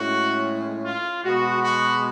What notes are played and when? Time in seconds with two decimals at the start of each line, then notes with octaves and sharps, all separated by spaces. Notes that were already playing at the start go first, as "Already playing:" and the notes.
Already playing: A2 G#3 C#4 F#4
0.85 F4
1.24 B2 G#3 B3 F#4
1.62 F#4